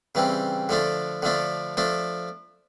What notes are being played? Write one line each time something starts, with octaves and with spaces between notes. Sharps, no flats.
C#3 E3 G3 C4
D3 F3 A3 D4
D3 F3 A3 D4
F3 A3 D4